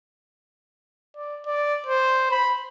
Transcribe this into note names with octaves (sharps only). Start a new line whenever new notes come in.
D5
D5
C5
B5